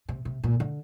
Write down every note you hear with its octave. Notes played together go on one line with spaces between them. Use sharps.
C3
C3
A#2
D3